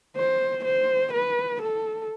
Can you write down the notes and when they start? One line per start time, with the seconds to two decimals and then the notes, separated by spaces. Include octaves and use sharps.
0.17 C5
0.65 C5
1.13 B4
1.62 A4